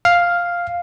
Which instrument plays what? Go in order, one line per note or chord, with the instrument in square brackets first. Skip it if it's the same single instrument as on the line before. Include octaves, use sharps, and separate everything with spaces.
[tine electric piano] F5